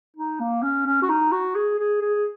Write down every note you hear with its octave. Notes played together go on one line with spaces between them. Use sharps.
D#4
A#3
C#4
C#4
F#4
D#4
F#4
G#4
G#4
G#4